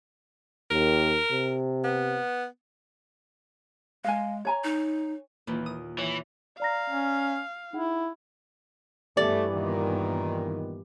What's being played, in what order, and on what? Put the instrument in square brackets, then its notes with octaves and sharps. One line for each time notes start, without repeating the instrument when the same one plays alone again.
[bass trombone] D#2 [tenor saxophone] A#4
[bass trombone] C3
[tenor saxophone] B3
[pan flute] G#3 [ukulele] F5 G#5
[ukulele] C#5 G#5 A#5
[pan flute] D#4
[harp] D#2 A#2 E3
D#6
[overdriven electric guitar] E3 [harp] C#5 E5
[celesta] D5 A#5 A#6 [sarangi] F5
[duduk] C#4
[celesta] D#4 G#4 F#5 [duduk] E4
[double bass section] G2 E3 B3 [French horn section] A3 [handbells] G4 [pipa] D5
[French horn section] A#2 D#3